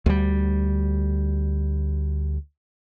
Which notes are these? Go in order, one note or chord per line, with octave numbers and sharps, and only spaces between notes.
D2 G3